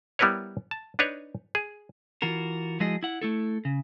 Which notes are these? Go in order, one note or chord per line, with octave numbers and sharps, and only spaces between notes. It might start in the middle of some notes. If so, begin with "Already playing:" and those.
G3 B3 E4 A#4 B4 C#5
A5
D4 D#4 B4 C#5
G#4
E3 F4 F#4 A#4
F3 G#3 E4 F#4 G#4 D#5
E4 F#5
A3 E4 A4
C#3